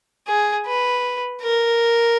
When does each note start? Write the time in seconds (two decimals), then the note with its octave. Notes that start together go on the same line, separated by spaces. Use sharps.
0.28 G#4
0.66 B4
1.42 A#4